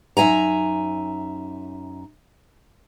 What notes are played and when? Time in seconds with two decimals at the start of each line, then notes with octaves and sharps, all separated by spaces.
0.17 F#2 D#4 E5 G#5 A#5